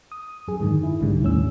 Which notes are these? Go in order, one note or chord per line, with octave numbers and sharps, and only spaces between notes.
D#6
F#2 G#4
G#2 D3 D#3
E4
C2 G#2 D3 G3
D#2 A2 C#4 E6